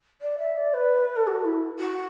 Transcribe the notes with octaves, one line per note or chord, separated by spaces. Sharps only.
D5
E5
D5
B4
A4
F#4
E4
F#4